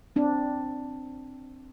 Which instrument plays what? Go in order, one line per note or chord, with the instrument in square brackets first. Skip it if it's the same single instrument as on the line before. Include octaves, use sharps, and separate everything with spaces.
[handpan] C4 D4